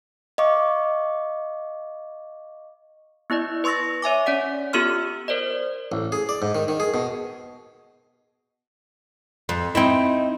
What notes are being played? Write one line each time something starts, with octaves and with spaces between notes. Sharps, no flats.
D#5 F5 C#6 D6
B3 E4 D5 D#5
B4 C6 C#6 E6 A6 A#6
C#5 E5 G#5 D6
C#4 C#5 D5 F#5 B6
B3 F4 G4 A4 C6 F6
A#4 C5 D5 D#5
A1
G#4
D5
G#2
D#3
D#3
G#4
B2
F2
C4 D#4 E4